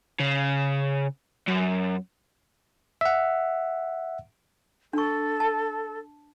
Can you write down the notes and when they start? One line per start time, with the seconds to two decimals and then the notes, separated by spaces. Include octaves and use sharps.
0.20 C#3
1.47 F#2
3.01 E5 F#5
4.93 D4 A4 C#6
5.40 A5